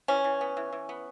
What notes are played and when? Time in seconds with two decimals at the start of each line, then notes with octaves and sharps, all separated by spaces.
0.08 E3 C#4
0.24 E3
0.41 B3
0.57 E3
0.73 E3
0.89 B3